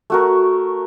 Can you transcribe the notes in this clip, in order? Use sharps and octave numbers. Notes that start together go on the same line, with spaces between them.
A3 F#4 A#4